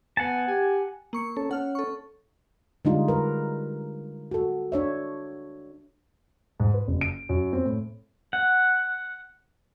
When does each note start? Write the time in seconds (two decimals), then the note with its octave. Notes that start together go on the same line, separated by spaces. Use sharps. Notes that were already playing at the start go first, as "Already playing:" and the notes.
0.17 B3 F#5 G#5 A5
0.48 G4 G#5
1.13 A#3 C#6 C#7
1.37 C#4 A4
1.51 C#4 F#5 F6
1.75 A4 C#6
2.85 D3 G3 G#3 D4 D#4 F4
3.08 A#4 B4
4.31 F#4 A4
4.72 D4 C#5 E5
6.60 G#2
6.74 B4
6.87 F#1
7.01 D7
7.29 F#2
7.53 C4
7.65 A2
8.33 F#5